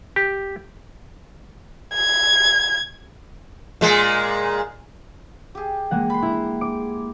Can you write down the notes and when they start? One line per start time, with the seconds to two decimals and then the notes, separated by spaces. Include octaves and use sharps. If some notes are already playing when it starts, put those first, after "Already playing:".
0.16 G4
1.95 G#6
3.81 A#2 G#3
5.55 G4 G#4
5.91 G#3 A#3 F#5
6.10 B5 C6
6.22 E4 A#5
6.61 D6